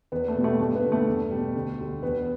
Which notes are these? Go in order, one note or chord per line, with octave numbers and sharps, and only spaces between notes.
E2 B3
A3
B2 G3
A3
G2 A3
B3
D3 G3
A3
E2
B2 G3
D2
D3 G3
E2 B3